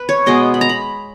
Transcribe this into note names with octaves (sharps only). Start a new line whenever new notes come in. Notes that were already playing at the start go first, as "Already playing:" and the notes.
Already playing: B4
C#5
B2 G#3 B3 D#5
B5
A#5
B5